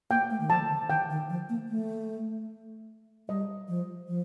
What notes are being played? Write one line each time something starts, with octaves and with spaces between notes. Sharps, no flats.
A#3 G5
A3
D#3
F3 A5
D3
D#3 G5
D#3
F3
A#3
A3
G3 D#5
F3
F3